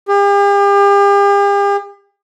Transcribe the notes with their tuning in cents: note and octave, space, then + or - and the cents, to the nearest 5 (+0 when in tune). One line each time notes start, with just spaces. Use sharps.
G4 +45